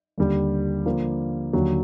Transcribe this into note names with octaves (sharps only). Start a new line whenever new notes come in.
D#2 D3 G3
D3 F3 A#3
D#2 D3 F#3